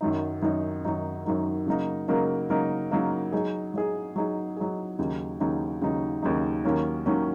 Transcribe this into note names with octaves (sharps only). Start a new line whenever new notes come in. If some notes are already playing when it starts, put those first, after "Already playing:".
F#2 D#3 F#3 D#4
F#2 D#3 F#3 D#4
F#2 D#3 F#3 D#4
F#2 D#3 F#3 D#4
C#3 F#3 A#3 D#4 A#4
C#3 F#3 A#3 D#4 A#4
C#3 F#3 A#3 D#4 A#4
C#3 F#3 A#3 D#4 A#4
F#3 D#4 G#4
F#3 D#4 G#4
F#3 D#4 G#4
F#3 D#4 G#4
D#2 C#3 F#3 D#4
D#2 C#3 F#3 D#4
D#2 C#3 F#3 D#4
D#2 C#3 F#3 D#4
D#2 D#3 F#3 A#3 C#4
D#2 D#3 F#3 A#3 C#4